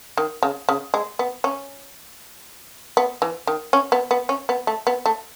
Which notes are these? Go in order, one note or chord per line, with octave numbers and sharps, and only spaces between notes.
D#3
C#3
C#3
G#3
B3
C#4
B3
E3
D#3
C#4
B3
B3
C#4
B3
A3
B3
A3